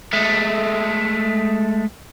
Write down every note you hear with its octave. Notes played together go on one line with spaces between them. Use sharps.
G#3 A3